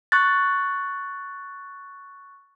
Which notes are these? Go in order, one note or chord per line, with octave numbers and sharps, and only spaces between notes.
C#6 F#6 A6